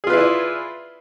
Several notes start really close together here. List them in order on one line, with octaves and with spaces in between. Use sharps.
G#4 F4 B4 E4 D5